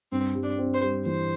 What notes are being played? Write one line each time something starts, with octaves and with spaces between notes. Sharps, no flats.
G2 C4
G3
D4
C4
C5
G3
E3 C5